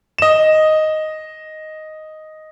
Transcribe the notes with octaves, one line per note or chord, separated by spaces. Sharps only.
D#5 E7